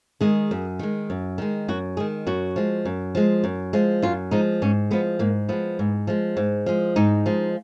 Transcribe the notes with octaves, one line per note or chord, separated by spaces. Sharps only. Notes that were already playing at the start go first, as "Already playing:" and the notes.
D#3 G#3 G#4
F#2
D#3 G#3
F#2
D#3 G#3
F#2 F#4
D#3 G#3 G#4
F#2 F#4
F3 G#3
F#2
F3 G#3
F#2
F3 G#3
F#2 F4
F3 G#3 D#4
G#2 C#4
F3 G#3 B3
G#2 A#3
F3 G#3 B3
G#2
F3 G#3
G#2
F3 G#3
G#2 D#4
F3 G#3